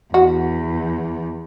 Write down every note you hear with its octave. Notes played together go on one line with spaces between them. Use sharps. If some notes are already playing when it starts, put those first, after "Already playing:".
E2 F#4